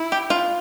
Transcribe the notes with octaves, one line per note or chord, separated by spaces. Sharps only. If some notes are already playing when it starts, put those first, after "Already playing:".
Already playing: E4
G4
F4